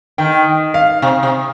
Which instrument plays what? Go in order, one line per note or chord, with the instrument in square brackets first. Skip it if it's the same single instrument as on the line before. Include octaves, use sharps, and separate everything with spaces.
[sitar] D#3 [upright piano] G5
[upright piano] F5
[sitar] C3
C3